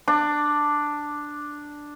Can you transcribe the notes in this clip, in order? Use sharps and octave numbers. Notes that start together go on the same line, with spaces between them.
D4 D6